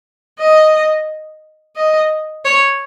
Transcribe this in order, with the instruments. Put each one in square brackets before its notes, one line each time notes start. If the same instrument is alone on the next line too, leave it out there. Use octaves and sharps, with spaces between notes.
[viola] D#5
D#5
C#5